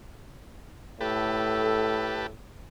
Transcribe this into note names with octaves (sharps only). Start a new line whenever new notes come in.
A2 G4 A4 B4 A5